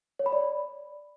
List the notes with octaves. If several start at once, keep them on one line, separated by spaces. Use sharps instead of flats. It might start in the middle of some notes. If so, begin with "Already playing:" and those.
C#5
B5
D5